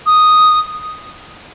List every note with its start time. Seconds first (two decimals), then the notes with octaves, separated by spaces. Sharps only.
0.06 D#6